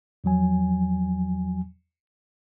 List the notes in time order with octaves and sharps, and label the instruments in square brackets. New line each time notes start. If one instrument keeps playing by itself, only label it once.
[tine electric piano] E2 F3 F#3 G#5